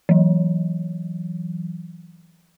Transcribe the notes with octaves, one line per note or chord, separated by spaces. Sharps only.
E3 F#3